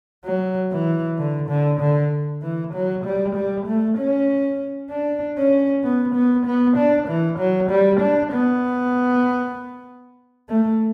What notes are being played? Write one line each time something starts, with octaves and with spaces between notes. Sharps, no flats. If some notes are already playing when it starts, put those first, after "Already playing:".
F#3
E3
D3
D3
D3
E3
F#3
G3
G3
A3
C#4
D4
C#4
B3
B3
B3
D4
E3
F#3
G3
D4
B3
A3